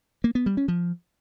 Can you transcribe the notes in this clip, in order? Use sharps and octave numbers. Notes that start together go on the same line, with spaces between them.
A#3
B3
G3
C#4
F3